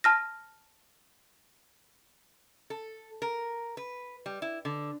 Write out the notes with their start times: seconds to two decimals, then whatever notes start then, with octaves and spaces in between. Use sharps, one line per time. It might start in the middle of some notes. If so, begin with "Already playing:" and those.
0.04 A5 F6 A#6
2.70 A4
3.22 A#4
3.77 B4
4.26 G3
4.42 E4
4.65 D3